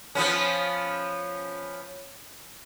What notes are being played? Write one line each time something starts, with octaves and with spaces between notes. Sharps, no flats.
F3 B3 C#4